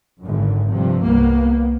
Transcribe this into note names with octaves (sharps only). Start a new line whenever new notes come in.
G#1 F#2 D3
G2 C3 F3
C2 A#3 B3